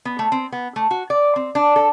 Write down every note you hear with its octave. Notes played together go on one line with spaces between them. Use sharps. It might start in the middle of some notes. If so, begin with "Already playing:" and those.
B3
A3
C4
B3
A3
F#4
D5
C4
D4
A4